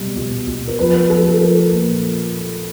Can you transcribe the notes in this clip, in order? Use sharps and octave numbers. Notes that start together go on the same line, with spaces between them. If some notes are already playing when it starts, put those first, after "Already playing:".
Already playing: B2 G3
B2
B2
A#4
F3 B4
F3 A4
A4
F3 A#4
A#2